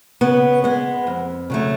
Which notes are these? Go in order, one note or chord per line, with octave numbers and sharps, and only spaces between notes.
C#3 B3
G#3 B3
F2
C#3 F#3 A3